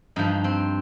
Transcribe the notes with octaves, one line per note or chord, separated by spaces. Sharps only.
G2 F3 D#4
C4